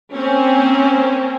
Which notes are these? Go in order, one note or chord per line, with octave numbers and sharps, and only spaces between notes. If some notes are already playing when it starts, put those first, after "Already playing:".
A#3 C4 C#4